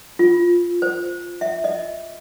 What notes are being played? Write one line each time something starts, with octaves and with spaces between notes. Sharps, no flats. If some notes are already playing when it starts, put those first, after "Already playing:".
F4
C5
E5
D#5